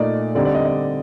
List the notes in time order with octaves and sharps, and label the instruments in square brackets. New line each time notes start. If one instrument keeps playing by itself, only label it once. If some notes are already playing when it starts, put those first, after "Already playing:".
Already playing: [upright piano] A#2 A3 D#4 D5
D3 G3 C4 D#4 D5
D5
D#5
D#5